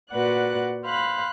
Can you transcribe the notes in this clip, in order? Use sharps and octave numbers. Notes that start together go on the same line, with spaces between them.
A#2 F#4 B4 D5 F#5 F#6
C5 F5 B5 F#6